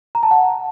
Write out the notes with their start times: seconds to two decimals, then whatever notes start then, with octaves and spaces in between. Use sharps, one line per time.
0.15 A#5
0.23 A5
0.31 F#5